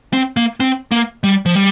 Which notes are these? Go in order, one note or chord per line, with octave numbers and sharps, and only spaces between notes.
C4
A#3
C4
A#3
G3
F3
G3